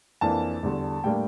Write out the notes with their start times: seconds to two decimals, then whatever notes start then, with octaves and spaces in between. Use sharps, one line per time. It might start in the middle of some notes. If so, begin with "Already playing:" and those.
0.21 F2 E3 A#3 D4 A5
0.63 E2 D3 G3
1.04 A2 G3 A#3 D4 G5